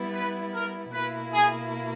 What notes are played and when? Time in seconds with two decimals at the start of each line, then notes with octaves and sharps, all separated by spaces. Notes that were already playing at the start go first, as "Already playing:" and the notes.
Already playing: G3 B3 E4
0.13 B4
0.54 A#4
0.93 B2 A#3 E4 B4
1.33 G#4